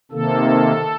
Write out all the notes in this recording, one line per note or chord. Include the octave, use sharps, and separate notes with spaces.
C3 D#3 A#3 A4